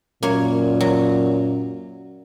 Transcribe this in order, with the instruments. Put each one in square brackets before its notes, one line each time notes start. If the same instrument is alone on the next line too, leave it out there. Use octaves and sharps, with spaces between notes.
[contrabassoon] F#2 [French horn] A#2 [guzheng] A#3 C#5
[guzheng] F#3